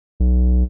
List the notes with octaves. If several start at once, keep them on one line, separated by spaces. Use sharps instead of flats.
B1